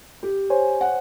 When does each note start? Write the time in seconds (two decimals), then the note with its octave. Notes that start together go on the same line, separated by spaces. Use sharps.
0.23 G4
0.50 C5 C#5 G#5
0.81 F#5